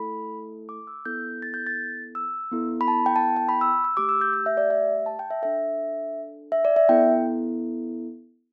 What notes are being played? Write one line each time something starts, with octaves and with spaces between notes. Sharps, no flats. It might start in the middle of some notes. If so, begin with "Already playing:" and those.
Already playing: A3 E4 A4 B5
D6
E6
B3 E4 A4 G6
A6
G6
A6
E6
B3 E4 A4
B5
A5
G5
A5
G5
B5
E6
E6
A3 G4 D6
E6
G6
G6
E5
D5
E5
A5
G5
E5
D4 A4 E5
E5
D5
E5
B3 E4 A4 G5